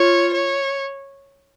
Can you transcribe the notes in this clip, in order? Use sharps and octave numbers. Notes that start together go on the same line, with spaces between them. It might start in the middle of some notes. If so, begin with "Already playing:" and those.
Already playing: F4 C#5
C#5